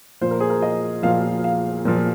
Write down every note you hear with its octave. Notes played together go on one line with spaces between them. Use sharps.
A#2 F3 C5
A#4
G#4
A#4
D#5
A#2 F3 F5
F5
A#2 F3